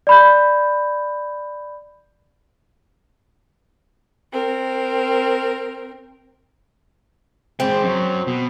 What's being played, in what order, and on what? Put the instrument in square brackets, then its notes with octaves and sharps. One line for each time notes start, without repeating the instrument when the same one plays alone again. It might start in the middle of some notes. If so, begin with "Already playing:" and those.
[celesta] D5 B5 G6
[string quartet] C4 A#4
[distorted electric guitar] G#3 G5 [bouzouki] C4
[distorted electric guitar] F#2 F#3
B2